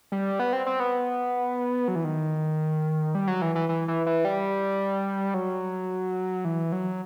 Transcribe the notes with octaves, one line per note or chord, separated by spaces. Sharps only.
G3
B3
C4
C4
B3
F#3
E3
D#3
G3
F#3
E3
E3
E3
E3
E3
G3
F#3
E3
F#3